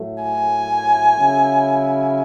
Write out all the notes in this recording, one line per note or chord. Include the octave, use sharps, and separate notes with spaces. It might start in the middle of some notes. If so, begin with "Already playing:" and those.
Already playing: A2 F#3 A3
G#5
C#3 F#3 C#4 E4